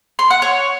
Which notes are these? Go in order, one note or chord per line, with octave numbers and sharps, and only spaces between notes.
C6
F#5
C#5